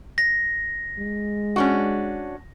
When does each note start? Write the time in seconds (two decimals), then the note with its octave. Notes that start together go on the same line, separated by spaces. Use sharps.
0.18 A#6
0.98 G#3
1.56 C#4 D4 F#4